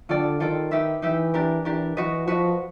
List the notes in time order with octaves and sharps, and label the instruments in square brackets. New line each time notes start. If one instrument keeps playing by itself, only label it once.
[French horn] D3 [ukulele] F4 A4 D5 G5
[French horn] D#3 [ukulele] F4 A4 D5 G5
[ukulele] D#4 G4 B4 E5
[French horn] E3 [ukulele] D#4 G4 B4 E5
[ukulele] D4 G4 A#4
[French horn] E3 [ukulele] D4 G4 A#4
[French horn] E3 [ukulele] F#4 B4 D#5
[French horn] F3 [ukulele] F#4 B4 D#5